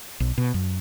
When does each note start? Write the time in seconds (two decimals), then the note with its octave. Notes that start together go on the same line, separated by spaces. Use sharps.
0.20 B1
0.38 B2
0.54 F#2